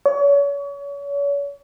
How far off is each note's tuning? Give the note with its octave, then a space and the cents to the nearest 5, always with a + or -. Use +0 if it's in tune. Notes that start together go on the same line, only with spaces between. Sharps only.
C#5 +35